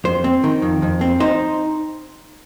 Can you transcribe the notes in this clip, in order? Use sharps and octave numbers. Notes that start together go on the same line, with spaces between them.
F2 C5
C4
D#3
F2
F2
C4
D#4 C5